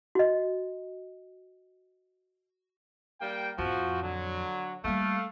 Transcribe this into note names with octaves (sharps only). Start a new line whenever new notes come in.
F#4 D#5
G3 A#3 G5
F2 A2 F3 F#4
D3 F#3
G3 A3 A#3 F5